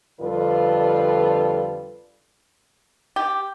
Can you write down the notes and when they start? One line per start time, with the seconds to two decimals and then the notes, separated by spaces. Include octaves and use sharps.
0.20 F2 D3 G3 F4 A4 B4
3.16 G4